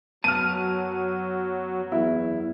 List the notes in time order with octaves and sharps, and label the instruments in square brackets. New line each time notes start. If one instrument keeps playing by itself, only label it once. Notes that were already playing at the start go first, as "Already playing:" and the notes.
[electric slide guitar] F#2 B3 A5 [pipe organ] F#3 [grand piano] F6 D#7
[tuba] E2 [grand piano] E4